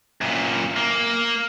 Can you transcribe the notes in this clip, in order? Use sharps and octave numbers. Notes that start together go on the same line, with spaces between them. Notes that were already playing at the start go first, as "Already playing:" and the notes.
F#2 A#2
A#3